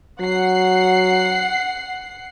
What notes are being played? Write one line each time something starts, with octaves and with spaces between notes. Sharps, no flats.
F#3 F#5 C7